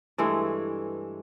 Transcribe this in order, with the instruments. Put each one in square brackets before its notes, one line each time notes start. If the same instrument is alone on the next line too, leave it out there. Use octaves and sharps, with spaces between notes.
[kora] G2 E3 G#3 A3